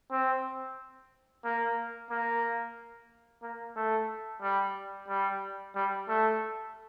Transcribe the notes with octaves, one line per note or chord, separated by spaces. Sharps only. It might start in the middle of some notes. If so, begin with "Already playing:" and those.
C4
A#3
A#3
A#3
A3
G3
G3
G3
A3